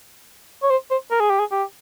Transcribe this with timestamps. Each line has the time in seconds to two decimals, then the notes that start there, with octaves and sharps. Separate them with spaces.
0.63 C#5
0.70 C5
0.90 C5
1.11 A#4
1.20 G#4
1.30 G4
1.39 G#4
1.51 G4